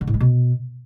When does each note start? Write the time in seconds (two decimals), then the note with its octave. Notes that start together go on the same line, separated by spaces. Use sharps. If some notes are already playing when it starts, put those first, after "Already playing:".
0.01 D3
0.07 A2
0.14 G#3
0.20 B2